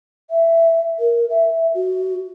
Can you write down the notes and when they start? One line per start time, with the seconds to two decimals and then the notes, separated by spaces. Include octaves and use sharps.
0.30 E5
0.99 A#4
1.30 E5
1.74 F#4